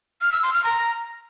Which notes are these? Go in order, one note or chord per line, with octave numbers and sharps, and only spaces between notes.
F6
E6
C6
F6
A#5